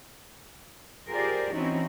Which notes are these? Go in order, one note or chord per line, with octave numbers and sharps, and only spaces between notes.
F4 G4 G#4 A#4 C5 D5
E3 C4 C#4 D#4 E4 F#4